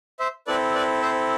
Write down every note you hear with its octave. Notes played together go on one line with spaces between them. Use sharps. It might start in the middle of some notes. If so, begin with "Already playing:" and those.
C5 E5
C4 E4 A4 B4 D5
B4 D5
C5 E5